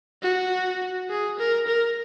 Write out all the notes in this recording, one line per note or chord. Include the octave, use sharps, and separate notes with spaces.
F#4
G#4
A#4
A#4